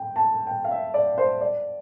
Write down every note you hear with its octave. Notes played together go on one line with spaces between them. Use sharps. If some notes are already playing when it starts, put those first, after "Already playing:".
Already playing: G5
A5
G5
F5
E5
D5
C5
D5